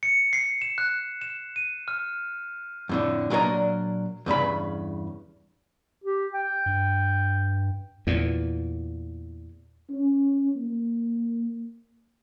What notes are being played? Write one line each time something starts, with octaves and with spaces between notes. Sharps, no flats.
C#7
C7
E7
F#6
E7
D#7
F6
F2 A2 D3
A#2 F#3 D4 A#4 D#5
E2 G2 C#3 B5
G4
G5
G2
E2 A#2
C#4
A#3